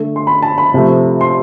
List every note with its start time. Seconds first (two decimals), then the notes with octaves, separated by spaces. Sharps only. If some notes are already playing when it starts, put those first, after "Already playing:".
Already playing: D3 A3
0.16 C6
0.27 B5
0.42 A5
0.58 B5
0.74 C3 F3 A3
1.21 C6